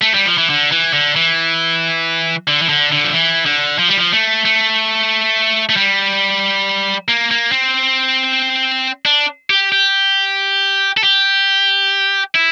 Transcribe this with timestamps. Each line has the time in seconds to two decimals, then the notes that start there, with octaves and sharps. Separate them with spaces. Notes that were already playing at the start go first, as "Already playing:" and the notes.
0.02 A3
0.14 G3
0.26 F3
0.38 E3
0.50 D3
0.72 E3
0.93 D3
1.16 E3
2.48 D3
2.62 E3
2.69 D3
2.92 D3
3.04 F3
3.13 E3
3.46 D3
3.79 F3
3.89 G3
3.97 F3
4.13 A3
4.45 A3
5.69 A3
5.76 G3
7.09 A#3
7.31 A#3
7.52 C4
9.06 D4
9.50 G4
9.72 G4
10.97 A4
11.03 G4
12.35 E4